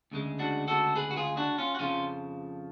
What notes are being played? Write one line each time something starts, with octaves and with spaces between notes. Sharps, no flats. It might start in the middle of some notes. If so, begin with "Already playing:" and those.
D2 C#3 G#3
D4 F#4
F#4 A4
G#4 B4
F#4
F4 G#4
D4 F#4
C#4 F4
F#4
F2 C#3 F3 C#4 F4